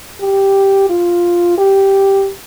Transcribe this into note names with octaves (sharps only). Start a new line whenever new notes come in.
G4
F4
G4